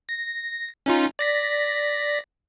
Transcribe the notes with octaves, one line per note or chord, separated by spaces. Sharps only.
A#6
C#4 D#4 F4
D5 A#6 B6